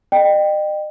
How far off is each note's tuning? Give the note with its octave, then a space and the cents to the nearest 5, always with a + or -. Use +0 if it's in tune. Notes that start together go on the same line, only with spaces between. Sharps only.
D#5 -40 G5 +0